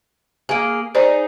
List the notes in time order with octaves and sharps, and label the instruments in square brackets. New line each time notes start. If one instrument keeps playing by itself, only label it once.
[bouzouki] A#3 G#4
[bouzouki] D#4 G#4 [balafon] C5 D5